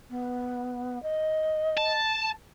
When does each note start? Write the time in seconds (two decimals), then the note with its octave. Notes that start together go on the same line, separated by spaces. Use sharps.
0.10 B3
1.03 D#5
1.78 A5